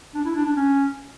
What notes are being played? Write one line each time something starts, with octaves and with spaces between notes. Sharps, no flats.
D4
E4
D4
D4
C#4